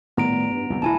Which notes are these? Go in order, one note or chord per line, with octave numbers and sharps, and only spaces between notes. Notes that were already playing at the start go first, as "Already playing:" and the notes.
A2 D#3 G3 B3 A#5 D7
G2
C2 F2 D3
E1 A#1 E4 G#5 A5